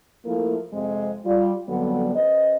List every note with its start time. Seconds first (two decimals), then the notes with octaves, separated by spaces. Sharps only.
0.25 F3 A3 A#3 E4 F4 A#4
0.72 F2 C3 G#3 C4
1.25 G3 F4
1.68 F2 D3 F#3 G3 B3
2.14 C#3 B4 C5 D#5